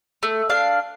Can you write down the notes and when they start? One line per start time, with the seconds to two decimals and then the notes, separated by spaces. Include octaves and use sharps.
0.23 A3
0.50 D4 F5